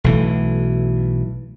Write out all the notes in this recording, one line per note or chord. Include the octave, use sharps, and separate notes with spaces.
B1 E3 A3